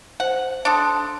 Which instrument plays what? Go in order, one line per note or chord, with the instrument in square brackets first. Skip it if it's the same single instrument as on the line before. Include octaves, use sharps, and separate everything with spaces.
[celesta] C5 [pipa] F#5
[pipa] D4 A4 [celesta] C6 D#6 F#6